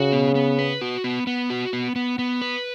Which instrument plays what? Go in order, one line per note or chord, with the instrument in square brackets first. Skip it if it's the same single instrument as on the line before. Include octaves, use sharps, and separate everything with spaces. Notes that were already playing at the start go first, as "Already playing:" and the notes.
Already playing: [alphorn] C#3 [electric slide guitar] F#4
[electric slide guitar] B3
B3
B4
F#4
B3
B3
F#4
B3
B3
B3
B4